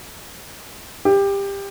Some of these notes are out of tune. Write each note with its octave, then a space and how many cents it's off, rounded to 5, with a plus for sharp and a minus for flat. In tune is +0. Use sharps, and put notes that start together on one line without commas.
G4 +20